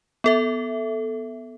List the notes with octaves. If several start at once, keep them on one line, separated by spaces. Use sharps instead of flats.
B3 A4 E5